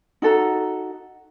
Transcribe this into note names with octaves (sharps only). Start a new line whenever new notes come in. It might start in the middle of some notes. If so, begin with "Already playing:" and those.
D#4 F#4 A4 A#5